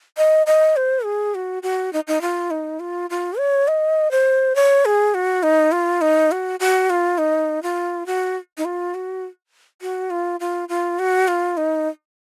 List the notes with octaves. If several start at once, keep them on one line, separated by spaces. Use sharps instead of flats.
D#5
D#5
C5
G#4
F#4
F#4
D#4
D#4
F4
D#4
F4
F4
C#5
D#5
C5
C#5
G#4
F#4
D#4
F4
D#4
F#4
F#4
F4
D#4
F4
F#4
D#4
F4
F#4
F#4
F4
F4
F4
F#4
F4
D#4